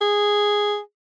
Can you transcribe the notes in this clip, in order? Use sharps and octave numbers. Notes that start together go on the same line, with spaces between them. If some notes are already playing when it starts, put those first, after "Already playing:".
G#4